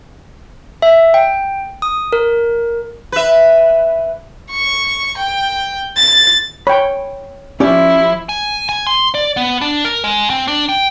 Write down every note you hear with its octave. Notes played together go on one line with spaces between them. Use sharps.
E5
G5
D#6
A#4
B4 E5
C#6
G5
A6
C#5 G5 B5
F3 C#4 E4 G4 D5
G#5
G#5
C6
D5
B3
D4
A#4
G#3
C4
D4
G5